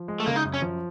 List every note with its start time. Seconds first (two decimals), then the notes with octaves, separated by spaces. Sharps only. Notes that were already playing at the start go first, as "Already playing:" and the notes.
Already playing: F3
0.08 G#3
0.20 A3
0.26 C#3 A#3
0.36 D#4
0.45 F#2
0.54 C#4
0.62 F3